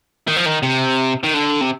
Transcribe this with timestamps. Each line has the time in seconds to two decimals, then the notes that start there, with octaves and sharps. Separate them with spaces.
0.27 D#3
0.36 F3
0.46 D#3
0.63 C3
1.23 D#3
1.34 D3
1.61 C3